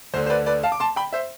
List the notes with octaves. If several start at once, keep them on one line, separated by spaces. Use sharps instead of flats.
D2 D3 C5
C5
B4 D5
B4 D5
F5 A5
D6
A5 C6
G5 B5
C5 E5